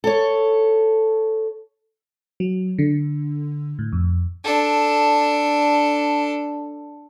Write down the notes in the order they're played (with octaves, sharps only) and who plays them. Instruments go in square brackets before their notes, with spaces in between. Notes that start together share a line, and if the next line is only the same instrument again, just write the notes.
[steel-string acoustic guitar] A4 C#5
[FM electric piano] F#3
D3
A2
F2
[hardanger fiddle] D4 A4